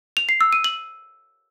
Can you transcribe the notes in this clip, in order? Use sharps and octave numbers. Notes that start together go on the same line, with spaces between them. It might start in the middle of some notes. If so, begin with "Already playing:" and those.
F7
C7
E6
D#7
F#7